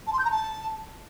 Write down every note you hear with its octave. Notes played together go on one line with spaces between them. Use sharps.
A5
C6
G6
A#5
A5